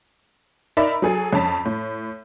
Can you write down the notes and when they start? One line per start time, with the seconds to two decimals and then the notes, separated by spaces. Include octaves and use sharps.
0.77 D#4 A#4 D5 E5 B5
1.02 F#3 G#4 A4
1.33 F2 C#4 A5 B6
1.65 A2